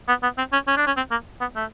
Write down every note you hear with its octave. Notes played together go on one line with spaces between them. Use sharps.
B3
B3
C4
C#4
C#4
D4
C#4
C4
A#3
B3
A3